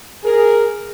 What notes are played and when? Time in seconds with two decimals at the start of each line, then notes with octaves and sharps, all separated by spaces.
0.24 G#4 A#4